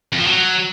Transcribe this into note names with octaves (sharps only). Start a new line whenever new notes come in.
F2
F3
F#3